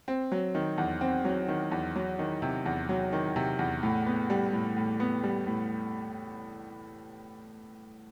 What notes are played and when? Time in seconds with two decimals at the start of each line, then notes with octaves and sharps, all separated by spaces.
0.08 C4
0.32 F#3
0.55 D#3
0.78 E2
1.01 C4
1.25 F#3
1.48 D#3
1.71 E2
1.96 F#3
2.19 D#3
2.42 C3
2.66 E2
2.89 F#3
3.13 D#3
3.36 C3
3.59 E2
3.83 A2
4.06 B3
4.30 G3
4.53 A2
4.77 A2
5.00 B3
5.23 G3
5.47 A2